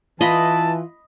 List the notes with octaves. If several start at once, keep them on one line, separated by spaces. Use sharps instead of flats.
E3 F4 D#5 A5 B5